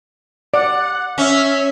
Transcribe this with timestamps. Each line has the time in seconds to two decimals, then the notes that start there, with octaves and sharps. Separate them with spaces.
0.54 D5 F#5
1.18 C#4 E5